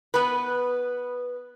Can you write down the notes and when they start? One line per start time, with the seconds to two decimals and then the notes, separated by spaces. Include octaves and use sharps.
0.14 B3 B4